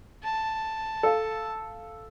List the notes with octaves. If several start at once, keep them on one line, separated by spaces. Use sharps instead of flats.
A5
A4 F5